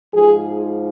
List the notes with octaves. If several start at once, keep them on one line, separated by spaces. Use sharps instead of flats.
G#2 F3 G#4